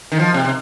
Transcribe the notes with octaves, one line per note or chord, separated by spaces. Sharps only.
D#3
F3
C3
C3